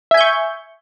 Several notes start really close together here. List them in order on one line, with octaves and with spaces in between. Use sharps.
E5 G#5 G6 C#6